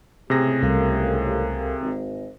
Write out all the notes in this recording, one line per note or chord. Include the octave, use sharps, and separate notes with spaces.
C#2 A2 C3 G4 G#4 A#6
C2 A4 A#4 F5
G#1